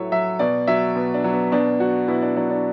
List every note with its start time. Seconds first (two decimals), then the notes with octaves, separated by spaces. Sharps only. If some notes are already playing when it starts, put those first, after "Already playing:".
Already playing: A2 F#3 A4 B4 C#5 E5
0.12 F#3 E5
0.39 B2 D5
0.67 F#3 E5
0.96 B2
1.14 D4
1.24 F#3
1.33 B3
1.52 B2 D4
1.80 F#3 F#4
2.08 B2 E4
2.22 D4
2.36 F#3 D4
2.50 D4